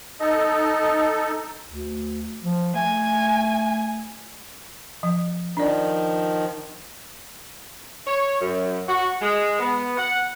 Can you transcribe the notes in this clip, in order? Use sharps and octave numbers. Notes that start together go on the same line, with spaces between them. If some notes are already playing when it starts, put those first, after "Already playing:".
D#4 A4 D#5
D2
F3
A3 G#5
F3
D#3 F3 D4 D5
C#5
F#2
F#4
G#3
B3
F#5